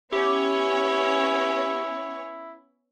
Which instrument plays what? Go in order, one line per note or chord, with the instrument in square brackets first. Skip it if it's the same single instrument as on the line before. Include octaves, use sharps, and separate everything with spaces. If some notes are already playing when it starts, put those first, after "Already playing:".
[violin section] B3 C#4 C#5 [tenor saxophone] E4 [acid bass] G4